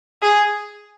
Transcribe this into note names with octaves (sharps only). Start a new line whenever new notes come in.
G#4